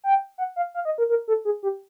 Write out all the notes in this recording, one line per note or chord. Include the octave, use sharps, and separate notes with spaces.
G5
F#5
F5
F5
D#5
A#4
A#4
A4
G#4
G4